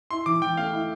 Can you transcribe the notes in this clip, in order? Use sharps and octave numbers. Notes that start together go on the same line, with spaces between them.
E4 C6
E3 D6
E3 G5
A3 F5
E4